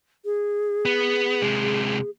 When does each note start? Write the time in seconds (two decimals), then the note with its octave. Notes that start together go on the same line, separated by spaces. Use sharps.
0.25 G#4
0.85 B3
1.42 C3 G#3